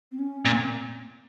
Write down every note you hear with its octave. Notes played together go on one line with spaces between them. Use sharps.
C4
C#4
A#2 C4